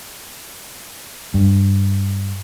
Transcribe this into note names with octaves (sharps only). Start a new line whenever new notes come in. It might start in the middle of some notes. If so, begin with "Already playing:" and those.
G2